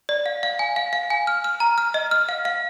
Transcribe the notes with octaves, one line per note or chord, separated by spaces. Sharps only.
D5
F5
F5
G#5
F5
F5
G#5
F6
F6
A#5
F6
D#5
F6
F5
F5